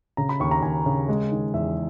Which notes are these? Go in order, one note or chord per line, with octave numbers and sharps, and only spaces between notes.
C#3 A#5
B5
D#2 C#6
A#5
D#2 G#5
C#3
G#3
D#3
E2 E5